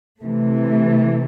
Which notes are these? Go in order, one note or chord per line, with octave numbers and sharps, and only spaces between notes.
C3 E3 A3